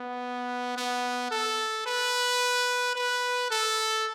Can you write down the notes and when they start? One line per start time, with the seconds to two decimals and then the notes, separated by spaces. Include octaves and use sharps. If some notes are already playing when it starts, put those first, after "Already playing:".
Already playing: B3
0.77 B3
1.31 A4
1.86 B4
2.96 B4
3.51 A4